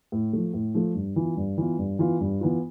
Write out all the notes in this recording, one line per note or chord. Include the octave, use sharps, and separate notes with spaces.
A2
F3 A3
A2
F3 A3
G2
E3 B3 F4
G2
E3 B3 F4
G2
E3 B3 F4
G2
E3 B3 F4